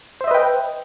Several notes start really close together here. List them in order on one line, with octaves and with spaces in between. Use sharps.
C5 E5 D#5 B4 G5